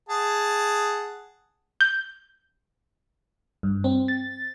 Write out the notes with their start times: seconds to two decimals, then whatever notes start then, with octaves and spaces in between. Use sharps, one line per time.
0.09 G#4 F#5 A5
1.81 G6
3.63 G2
3.84 C4
4.08 A6